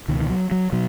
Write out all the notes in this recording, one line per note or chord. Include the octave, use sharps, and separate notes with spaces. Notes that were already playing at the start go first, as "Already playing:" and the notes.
C#2 B2 D#3
D#3
F#3
F#3
B2 F#3